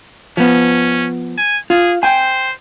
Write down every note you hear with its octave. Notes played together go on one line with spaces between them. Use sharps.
F3 B3 C#4
G#5
F4 G#4
C5 G5 G#5